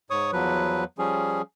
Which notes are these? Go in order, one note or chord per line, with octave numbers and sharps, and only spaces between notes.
G#2 C#5 C#6 D#6
E2 F3 F#3 B4
F3 G3 C#4 G#4